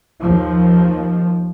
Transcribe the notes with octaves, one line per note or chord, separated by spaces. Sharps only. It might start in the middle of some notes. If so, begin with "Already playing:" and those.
D#2 F3